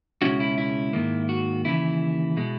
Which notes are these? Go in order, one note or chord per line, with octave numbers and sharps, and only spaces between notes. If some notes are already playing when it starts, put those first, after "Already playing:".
C#2 B2 G#3 C#4 E4 F#4
E4
E4
G#2 D#3 A#3
F#4
D#2 C#3 E3 E4
B2 G#3